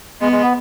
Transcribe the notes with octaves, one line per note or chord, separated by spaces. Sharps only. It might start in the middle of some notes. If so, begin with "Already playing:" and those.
G#3 B3
G#3
B3